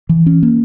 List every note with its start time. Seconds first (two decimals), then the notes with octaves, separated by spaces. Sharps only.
0.09 E3
0.26 C#4
0.43 A#3